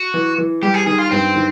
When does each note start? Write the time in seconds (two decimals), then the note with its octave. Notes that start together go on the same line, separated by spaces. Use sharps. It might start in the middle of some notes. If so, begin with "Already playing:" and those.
Already playing: F#4
0.14 E3
0.38 E3
0.62 G3 G4
0.74 G#4
0.86 D#3 G#4
0.98 F4
1.11 G2 C4
1.36 D#3